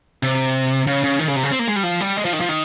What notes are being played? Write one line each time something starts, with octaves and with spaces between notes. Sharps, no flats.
C3
C#3
C#3
D#3
C#3
C3
C#3
C4
A#3
G#3
G3
F3
G3
G#3
F3
D#3
F3
D#3